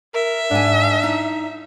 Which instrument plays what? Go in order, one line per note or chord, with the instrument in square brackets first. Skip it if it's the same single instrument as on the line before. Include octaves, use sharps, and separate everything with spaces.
[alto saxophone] A#4 [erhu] E5
[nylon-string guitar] G#2 G#5 [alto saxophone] D4
[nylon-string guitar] D#4 E4